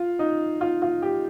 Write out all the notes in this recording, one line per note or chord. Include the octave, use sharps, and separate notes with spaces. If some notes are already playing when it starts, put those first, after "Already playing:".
Already playing: F4
D#4
F4
F4
G4